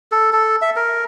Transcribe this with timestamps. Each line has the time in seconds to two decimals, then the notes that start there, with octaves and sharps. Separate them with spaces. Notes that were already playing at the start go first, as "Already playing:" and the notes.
0.12 A4
0.33 A4
0.62 E5
0.76 A#4